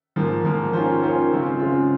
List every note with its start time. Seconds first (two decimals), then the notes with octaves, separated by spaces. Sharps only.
0.16 G#2 F3 A#3
0.45 G#2 F3 A#3
0.73 D#3 A#3 C#4 F4 C5
1.02 D#3 A#3 C#4 F4 C5
1.31 F#2 C#3 G#3 C4 F4
1.59 F#2 C#3 G#3 C4 F4